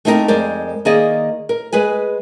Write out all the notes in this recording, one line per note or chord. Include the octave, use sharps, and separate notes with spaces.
A3 A#3 C4 D#4 E4 A#4
F2 G#3 A#4 C5 D5
D#3 A#3 G#4 D5 D#5
A#4
G#3 G#4 B4 G#5